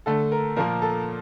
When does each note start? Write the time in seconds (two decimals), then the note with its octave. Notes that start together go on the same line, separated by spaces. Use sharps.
0.06 D3 A3 A4
0.32 A#4
0.56 A#2 F3 A#3 A#4
0.82 A4